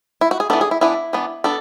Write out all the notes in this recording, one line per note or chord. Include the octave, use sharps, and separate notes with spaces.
E4
F#4
G#4
E3 B3 D4 A4
G#4
E4
E3 B3 D4 E4
E3 B3 D4
B3 D4 A4